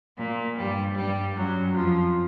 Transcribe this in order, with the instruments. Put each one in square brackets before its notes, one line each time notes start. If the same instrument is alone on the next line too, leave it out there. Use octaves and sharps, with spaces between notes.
[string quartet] A#2 A#3
G2 G3
G2 G3
F#2 F#3
F2 F3